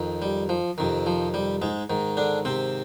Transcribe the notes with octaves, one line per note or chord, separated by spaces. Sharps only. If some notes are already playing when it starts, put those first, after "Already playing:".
Already playing: F2 D#3
G3
F3
F2 C3 D#3
F3
G3
G#2 G#3
G#2 D#3
D3 D4
C3 C4